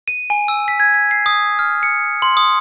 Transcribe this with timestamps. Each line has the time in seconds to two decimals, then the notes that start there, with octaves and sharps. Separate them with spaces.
0.08 D#7
0.30 G#5
0.48 E6
0.68 B6
0.80 G#6
0.94 B6
1.11 C7
1.26 D#6
1.59 F6
1.83 C#7
2.22 C6
2.37 D#6